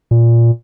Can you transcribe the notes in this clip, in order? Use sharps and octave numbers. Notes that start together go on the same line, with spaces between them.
A#2